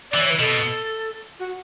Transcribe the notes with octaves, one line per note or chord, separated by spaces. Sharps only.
E3 D5
C#5
B4
B2 A4
F#4